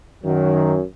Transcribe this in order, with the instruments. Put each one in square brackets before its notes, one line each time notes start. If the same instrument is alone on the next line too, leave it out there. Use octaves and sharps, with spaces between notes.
[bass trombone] F#2 [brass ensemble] D#3 F#3